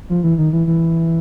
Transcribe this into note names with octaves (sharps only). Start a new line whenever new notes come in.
F3
E3
D#3
E3
E3